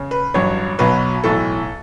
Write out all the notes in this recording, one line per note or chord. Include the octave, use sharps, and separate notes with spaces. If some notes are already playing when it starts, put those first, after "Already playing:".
Already playing: C#3
B4
A1 G2 F#3 C#5
B1 B2 F#3 B4
B1 A2 E3 A4